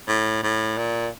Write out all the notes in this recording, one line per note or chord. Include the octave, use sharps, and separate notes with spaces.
A2
A2
A#2